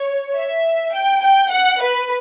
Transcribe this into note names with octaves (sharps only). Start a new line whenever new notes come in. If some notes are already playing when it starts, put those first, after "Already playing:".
Already playing: C#5
E5
G5
G5
F#5
B4